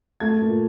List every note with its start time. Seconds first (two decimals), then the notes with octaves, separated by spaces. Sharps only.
0.20 A3 G#6
0.41 A#2